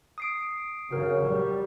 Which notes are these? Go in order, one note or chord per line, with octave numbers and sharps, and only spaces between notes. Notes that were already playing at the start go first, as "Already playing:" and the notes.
D#6 C7 D7
C#3 F#4 A#4
G3